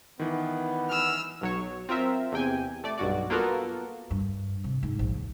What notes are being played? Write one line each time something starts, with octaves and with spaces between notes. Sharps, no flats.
D#3 E3 B3
E6 F6
B1 F#3 C#5
C4 F4 A#4 E5
E2 C3 G5 G#5
A3 D5
B1 G2 F#4 D5
A#3 B3 F4 F#4 A4 A#4
G2
C3
G#2
A#1
D#2